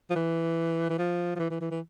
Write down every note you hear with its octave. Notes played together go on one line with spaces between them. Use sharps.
F3
E3
E3
F3
F3
E3
E3
E3
E3